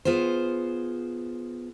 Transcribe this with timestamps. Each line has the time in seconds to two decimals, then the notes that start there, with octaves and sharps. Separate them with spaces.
0.05 B3 F4 G#4 C5